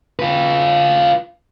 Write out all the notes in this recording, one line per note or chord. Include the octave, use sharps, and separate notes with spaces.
F4 B4